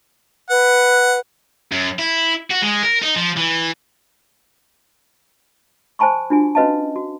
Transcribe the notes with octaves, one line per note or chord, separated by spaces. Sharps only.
B4 F#5
F#2
E4
F#4
G#3
A#4
D#4
F3
E3
C5 G#5 A5 B5 C#6
D4 F4 F#4 G#5
C#4 F#4 B4 D#5 F5 A5
F#4